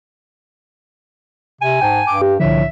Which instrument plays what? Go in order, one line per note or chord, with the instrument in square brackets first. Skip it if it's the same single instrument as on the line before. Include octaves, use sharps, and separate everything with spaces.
[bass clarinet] C3 [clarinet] G#5
[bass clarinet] G#2 [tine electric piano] G5 A5
[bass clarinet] G2 [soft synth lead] D6
[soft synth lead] G4
[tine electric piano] C2 F3 [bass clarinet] A2 [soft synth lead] D3 [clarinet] E5